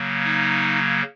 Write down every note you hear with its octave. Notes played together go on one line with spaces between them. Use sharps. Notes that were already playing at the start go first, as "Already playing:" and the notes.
Already playing: C#3 F#3 A#3
D#4